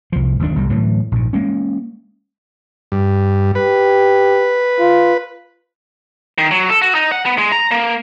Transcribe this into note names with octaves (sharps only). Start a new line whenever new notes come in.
C2 F3
F#1 D#2 C#3 D4
G1 C2 C3 G3
A2 D3 E3 F#3
A#1 G#2
G#3 A#3 C#4
G2
G4 B4
F4
D#3
F#3
A4
F#4
D#4
F#5
B3
G#3
A#5
A#3